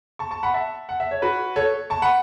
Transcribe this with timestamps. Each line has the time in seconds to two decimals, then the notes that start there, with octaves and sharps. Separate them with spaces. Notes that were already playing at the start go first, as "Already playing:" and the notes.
0.19 A5 C#6
0.31 A5 C#6
0.43 F#5 B5
0.54 E5 A5
0.89 F#5
1.00 E5
1.11 C#5
1.22 F#4 B4
1.56 A4 C#5
1.90 A5 C#6
2.02 F#5 B5